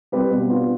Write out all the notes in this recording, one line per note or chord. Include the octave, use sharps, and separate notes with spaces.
G3 C4 G4 B4
B2
B3 D4 F4